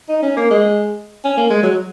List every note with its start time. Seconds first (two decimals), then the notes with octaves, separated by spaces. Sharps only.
0.09 D#4
0.22 C#4
0.37 A#3
0.51 G#3
1.24 C#4
1.37 A#3
1.50 G#3
1.63 F#3